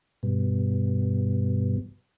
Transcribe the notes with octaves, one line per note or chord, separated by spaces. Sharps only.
G2 B2